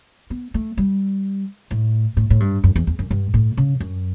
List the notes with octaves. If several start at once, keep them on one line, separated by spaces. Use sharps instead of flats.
B3
A3
G3
A2
A2
A2
G2
F#2
E2
E2
F#2
G2
A2
C#3
F#2